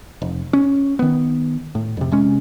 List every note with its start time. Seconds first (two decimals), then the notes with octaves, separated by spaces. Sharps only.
0.22 F1
0.53 C#4
0.99 D#3 B3
1.75 A2
1.97 F2 C3
2.12 C3 G#3 C#4